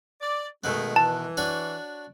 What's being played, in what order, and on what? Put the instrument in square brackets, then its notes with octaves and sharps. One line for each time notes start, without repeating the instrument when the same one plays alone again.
[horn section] D5
[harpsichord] B2 D#3 B3 [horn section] G#3 A3
[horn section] E3 [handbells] A5
[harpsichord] D4 F#4 C#5